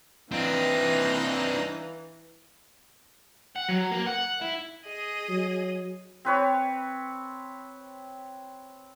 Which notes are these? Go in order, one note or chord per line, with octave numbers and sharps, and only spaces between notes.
E3 C4 D4 D#4 F5
F#5
F#3
A#3
F#5
E4
G#4 D#5 D#6
F#3
C4 B4 C#5